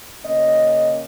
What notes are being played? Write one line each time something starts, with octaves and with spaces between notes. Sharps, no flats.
C#3 A#3 C#4 D#5